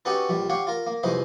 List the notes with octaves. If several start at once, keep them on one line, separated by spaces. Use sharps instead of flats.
C#4 D#4 F#4 G4 A4 B4
A#1 G3
G4 C#5 F5 F#5
F4 A#4
A#3
C2 F2 G#3 D#4 B4 C5